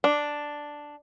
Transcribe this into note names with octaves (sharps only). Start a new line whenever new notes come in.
D4